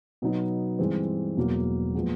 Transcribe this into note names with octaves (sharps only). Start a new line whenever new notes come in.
B2 F#3 B3 D#4
G2 E3 G#3 C4
E1 E2 B2 F#3 A#3
A#2 F3 G#3 B3